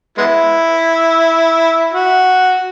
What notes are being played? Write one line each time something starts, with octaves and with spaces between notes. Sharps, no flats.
G#3 B3 E4
F#4